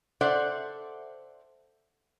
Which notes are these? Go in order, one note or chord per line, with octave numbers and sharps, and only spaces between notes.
A4 C5 D5 E5 F#5